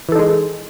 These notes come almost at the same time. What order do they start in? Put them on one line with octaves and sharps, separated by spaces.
E3 A4 D#4 G#3